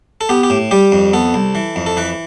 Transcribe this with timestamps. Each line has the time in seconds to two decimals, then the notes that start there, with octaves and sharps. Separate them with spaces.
0.21 A4
0.29 B3 G4
0.43 G4
0.50 A2
0.71 G3 G4
0.92 F2
1.13 B3 A4
1.34 C2
1.55 E3
1.76 F2
1.86 A4
1.97 E3 B4